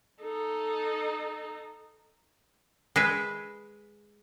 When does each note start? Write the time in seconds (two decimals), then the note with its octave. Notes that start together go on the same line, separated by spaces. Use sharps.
0.22 D#4 A4
2.96 G#3 B4 E5